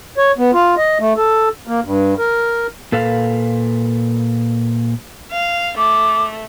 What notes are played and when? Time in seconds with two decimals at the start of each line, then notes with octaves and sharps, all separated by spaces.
0.18 C#5
0.38 B3
0.53 F4
0.77 D#5
1.00 A3
1.17 A4
1.67 A#3
1.84 G2
2.19 A#4
2.92 A#2 A4 B4 F5
5.31 F5
5.77 A3 D6